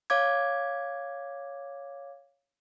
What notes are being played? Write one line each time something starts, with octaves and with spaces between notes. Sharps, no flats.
C#5 F5 D6 G#6